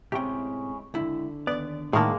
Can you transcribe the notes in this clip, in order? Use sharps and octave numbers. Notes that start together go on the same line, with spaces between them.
A2 C3 G#3 C#4 E4 G4 G5
C#2 D3 E4
D#2 B3 D5
A2 D#3 G#3 A#3 G#4 A#4 A5